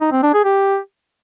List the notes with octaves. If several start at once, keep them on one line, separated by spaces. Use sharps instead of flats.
D#4
C4
D4
G#4
G4